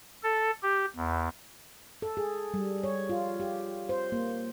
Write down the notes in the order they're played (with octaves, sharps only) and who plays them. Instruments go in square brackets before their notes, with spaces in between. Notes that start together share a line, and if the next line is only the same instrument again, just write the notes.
[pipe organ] A4
G4
E2
[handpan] A4
G#4
G3
C#5
F4
G4
C5
A#3